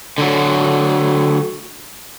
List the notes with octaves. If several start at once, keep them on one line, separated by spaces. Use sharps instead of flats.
D3 F#3